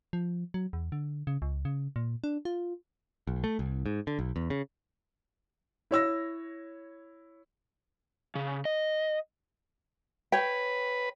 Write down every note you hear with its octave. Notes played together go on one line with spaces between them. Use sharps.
F3
F#3
E2
D3
C#3
C#2
C#3
A#2
D4
F4
B1
A3
C2
G#2
D3
B1
E2
C#3
E4 C#5 E6 A#6
C#3
D#5
B4 C#5 G5